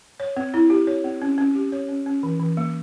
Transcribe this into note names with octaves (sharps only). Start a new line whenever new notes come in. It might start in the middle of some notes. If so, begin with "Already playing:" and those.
C#5
C4
E4
G4
C#5
C4
C#4
C#4
G4
C#5
C#4
C#4
E3
E3
A#3